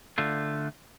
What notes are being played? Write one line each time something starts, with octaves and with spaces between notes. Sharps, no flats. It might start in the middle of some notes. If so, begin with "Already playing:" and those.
D3 A3 F4